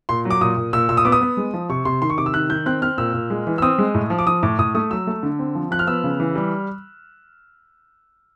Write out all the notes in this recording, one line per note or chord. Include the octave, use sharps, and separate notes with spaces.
A#2 C6
F#3
D6
A#2 D#6
A#2
A#2 E6
A#2 E6
D#6
B3 D6
D#6
B3
G#3
F3
C3 C#6
C3 C6
D#3 C6
C#6
C3 D6
E6
D#3 F#6
D#3 G6
C4 F#6
C4 F6
A#2 E6
A#2
G#3
E3
E6
C4 D#6
G#3
A2
F3
D6
F3 D#6
A2 D6
A2 D#6
A3 D#6
F#3 E6
A3
D3
C4
F3
F3 F#6
F6
B3 E6
C#3
E3
G3